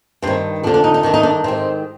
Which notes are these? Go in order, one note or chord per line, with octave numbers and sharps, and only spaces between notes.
G2 D#3 C4
F2 D3 D4
D4
D#4
D#4
G2 D#3 D4
D#4
D4
G#2 D#3 C4